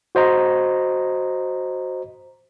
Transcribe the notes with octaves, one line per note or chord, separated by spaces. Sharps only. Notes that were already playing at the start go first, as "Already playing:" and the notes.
F#4 C5 D#5 A#5